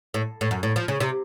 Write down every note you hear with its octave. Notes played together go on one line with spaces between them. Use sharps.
A2
A2
F#2
A2
F3
C#3
C3